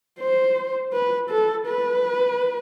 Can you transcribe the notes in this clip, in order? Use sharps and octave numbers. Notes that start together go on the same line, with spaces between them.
C5
B4
A4
B4